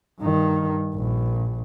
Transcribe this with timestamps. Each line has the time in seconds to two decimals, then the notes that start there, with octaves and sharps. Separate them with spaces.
0.20 G2 D#3
0.94 A#1